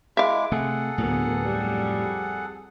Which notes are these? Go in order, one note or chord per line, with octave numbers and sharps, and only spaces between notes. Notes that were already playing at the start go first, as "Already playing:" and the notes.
G#3 E4 E5 F5 D6
C3 A3 G#4 A4 F#5
D2 A2 F#3 A#3 B3
F2 G3